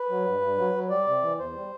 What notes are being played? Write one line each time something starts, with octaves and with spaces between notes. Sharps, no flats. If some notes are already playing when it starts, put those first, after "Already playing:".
Already playing: B4
F#3
G2
G2
F#3
F#3
G3 D5
C3
E3
E2 C5
G3